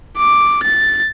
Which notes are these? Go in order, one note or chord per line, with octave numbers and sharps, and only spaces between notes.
D6
A6